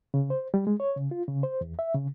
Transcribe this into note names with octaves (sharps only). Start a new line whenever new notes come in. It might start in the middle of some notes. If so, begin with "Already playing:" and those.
C#3
C5
G3
G#3
C#5
C#3
F4
C#3
C5
E2
E5
C#3